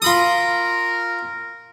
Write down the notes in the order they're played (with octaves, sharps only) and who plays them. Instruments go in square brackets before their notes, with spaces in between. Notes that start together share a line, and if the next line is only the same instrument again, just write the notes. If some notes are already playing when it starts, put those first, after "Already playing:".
[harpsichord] F4 B5 D#6 [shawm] A#4